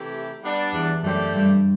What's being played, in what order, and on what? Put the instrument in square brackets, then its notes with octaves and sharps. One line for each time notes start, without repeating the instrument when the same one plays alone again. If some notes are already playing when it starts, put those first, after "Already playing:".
Already playing: [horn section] C3 E3 A3 E4 G4
G3 B3 D4
[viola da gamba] E2
[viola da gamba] F#2 [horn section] A3 D4 G4 C5
[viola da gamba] G2